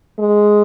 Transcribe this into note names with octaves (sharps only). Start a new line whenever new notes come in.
G#3